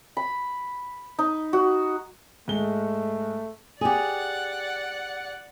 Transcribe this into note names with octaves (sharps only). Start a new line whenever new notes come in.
B5
D#4
F#4
G#2 G#3 A3 G7
G4 G#4 D5 F#5